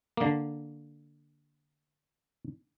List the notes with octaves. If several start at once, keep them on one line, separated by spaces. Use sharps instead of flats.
D3 A#3